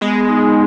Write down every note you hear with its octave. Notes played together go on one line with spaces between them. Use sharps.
G#3 B3
D#4